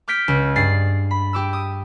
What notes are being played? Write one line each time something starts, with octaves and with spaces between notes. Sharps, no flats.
D6 F6 G6 B6 D7
C#2
G2 G#4 A6 C7
B5
G4 D6 E6
D#6